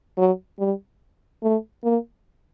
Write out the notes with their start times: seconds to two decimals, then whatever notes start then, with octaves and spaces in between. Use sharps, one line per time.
0.18 F#3
0.59 G3
1.43 A3
1.84 A#3